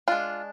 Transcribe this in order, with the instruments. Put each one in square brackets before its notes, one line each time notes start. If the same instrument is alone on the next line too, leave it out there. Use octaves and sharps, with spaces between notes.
[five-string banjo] G#3 D4 F4